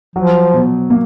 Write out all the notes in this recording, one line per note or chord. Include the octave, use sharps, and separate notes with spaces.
F3 F#3
B2
A#3